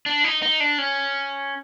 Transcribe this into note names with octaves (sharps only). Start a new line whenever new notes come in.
D4
D#4
D#4
D4
C#4